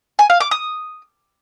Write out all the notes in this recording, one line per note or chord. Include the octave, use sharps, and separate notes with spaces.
G#5
F5
D6
D#6